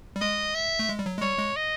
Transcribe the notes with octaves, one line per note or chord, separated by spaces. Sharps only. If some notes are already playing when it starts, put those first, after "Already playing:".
G3
G#3 D#5
E5
A3
G#3
G3
F#3
G#3
G3 C#5
G#3
D#5